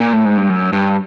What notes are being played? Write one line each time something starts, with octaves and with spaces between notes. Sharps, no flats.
A#2
A2
G#2
G2
F#2
G2